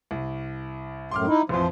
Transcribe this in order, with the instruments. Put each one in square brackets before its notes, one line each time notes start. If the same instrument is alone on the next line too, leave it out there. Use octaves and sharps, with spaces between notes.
[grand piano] C2
[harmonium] F#2 A2 [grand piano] C6 D6 F6
[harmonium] D#4 E4
[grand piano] A1 F2 [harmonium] F3 C5